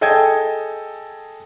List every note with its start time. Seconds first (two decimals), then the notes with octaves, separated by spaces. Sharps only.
0.01 G#4 A4 D#5 G5 D#6 G#6